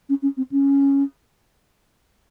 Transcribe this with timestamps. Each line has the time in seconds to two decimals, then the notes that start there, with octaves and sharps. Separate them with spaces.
0.09 C#4
0.22 C#4
0.37 C4
0.51 C#4